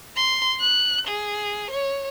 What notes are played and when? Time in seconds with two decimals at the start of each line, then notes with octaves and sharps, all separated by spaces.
0.16 C6
0.60 F#6
1.07 G#4
1.71 C#5